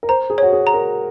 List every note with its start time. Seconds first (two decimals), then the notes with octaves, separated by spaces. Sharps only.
0.03 A#4
0.09 C5 A#5
0.30 G#4
0.38 F#4 C#5
0.53 G#4
0.67 A#5
0.74 A#4